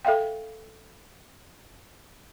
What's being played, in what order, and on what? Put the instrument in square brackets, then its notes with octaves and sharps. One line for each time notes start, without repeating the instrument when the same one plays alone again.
[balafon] A4 E5 F5 G5